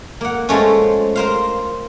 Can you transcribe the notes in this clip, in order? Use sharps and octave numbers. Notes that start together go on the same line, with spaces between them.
A#3 F#5
F3 G#3 A3 C#4
A#4 C5 F5